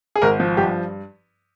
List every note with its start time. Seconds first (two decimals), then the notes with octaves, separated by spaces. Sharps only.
0.16 G#4
0.22 G#1 A#4
0.40 F3
0.57 G2 G4